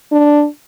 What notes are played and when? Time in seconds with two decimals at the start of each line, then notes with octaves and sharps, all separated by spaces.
0.12 D4